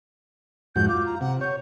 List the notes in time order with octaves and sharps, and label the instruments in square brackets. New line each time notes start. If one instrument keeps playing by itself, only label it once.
[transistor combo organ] F2 G#2 F#4 [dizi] G6
[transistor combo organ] F4 [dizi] D6
[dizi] A#5
[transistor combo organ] C3 [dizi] F#5
[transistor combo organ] C#5 [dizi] G6